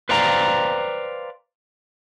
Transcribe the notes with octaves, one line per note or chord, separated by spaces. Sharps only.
B4 C5 D5 F5 G5 A#5